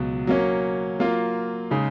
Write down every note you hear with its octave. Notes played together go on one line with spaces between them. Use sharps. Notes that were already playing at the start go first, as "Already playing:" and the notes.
Already playing: C#2 B2 F#3
F#3 A#3 C#4
F#3 A#3 F4
C#3 G#3 D#4